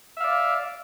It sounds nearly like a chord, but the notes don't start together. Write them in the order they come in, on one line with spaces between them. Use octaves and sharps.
E5 F5 D5